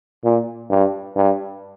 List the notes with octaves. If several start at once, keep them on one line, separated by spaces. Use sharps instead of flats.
A#2
G2
G2